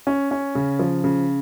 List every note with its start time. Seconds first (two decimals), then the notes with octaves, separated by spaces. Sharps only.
0.07 C#4
0.31 C#4
0.55 C#3
0.79 F3
1.04 C#3